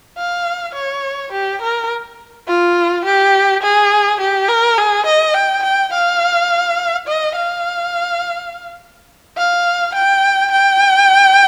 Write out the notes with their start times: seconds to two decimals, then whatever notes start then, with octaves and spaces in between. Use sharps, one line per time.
0.18 F5
0.75 C#5
1.32 G4
1.62 A#4
2.47 F4
3.05 G4
3.63 G#4
4.20 G4
4.48 A#4
4.78 G#4
5.06 D#5
5.34 G5
5.63 G5
5.93 F5
7.08 D#5
7.36 F5
9.37 F5
9.95 G5
10.52 G5